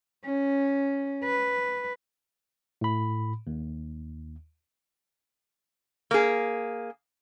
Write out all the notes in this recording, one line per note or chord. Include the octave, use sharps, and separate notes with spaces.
C#4
B4
A2 B5
D#2
A#3 G#4